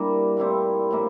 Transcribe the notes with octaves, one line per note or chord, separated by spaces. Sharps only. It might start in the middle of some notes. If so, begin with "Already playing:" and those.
Already playing: G2 G3 A#3 D4 E4 A#4
A#2 G3 C4 E4
A2 F3 A#3 E4